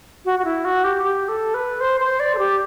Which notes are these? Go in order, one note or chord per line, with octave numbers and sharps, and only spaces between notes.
F#4
F#4
E4
F#4
G4
G4
A4
B4
C5
C5
D5
A4
G4